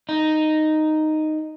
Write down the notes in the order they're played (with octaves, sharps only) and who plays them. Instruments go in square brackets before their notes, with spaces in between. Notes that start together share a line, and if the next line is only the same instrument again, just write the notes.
[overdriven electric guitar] D#4